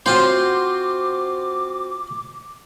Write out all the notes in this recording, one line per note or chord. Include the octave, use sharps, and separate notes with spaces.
C4 F4 F#4 C5 D6